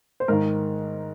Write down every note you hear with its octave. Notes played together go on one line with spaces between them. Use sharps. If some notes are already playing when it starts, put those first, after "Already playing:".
C5
G#2 D#3 A#4